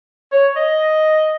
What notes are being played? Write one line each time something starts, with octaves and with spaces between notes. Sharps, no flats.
C#5
D#5